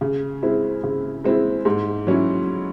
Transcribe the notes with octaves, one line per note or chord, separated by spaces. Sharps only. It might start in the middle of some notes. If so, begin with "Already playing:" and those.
C#3
G#3 C4 E4
C#3
G#3 C4 E4
G#2
F#3 C#4 E4